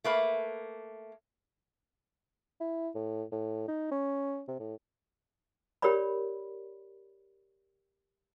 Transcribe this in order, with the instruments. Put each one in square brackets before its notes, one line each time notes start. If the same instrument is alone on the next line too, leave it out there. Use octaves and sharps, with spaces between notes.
[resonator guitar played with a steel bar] A3 A#3 B4
[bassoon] E4
A2
A2
D#4
C#4
C3
A2
[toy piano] G4 A#4 C#5 D5 B5